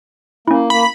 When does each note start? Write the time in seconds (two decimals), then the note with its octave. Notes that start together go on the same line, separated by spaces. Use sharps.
0.48 A#3 C#4 E4
0.70 A#3 B5